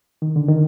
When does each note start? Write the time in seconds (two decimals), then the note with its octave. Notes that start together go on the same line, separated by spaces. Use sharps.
0.22 D#3
0.36 D3
0.48 D#3